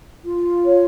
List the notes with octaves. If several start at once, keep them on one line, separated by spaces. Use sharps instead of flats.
F4
C#5